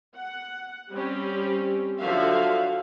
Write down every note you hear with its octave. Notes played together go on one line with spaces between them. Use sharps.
F#5
G3 C4 C#4 G4
D3 F3 F#3 F#4 E5 F5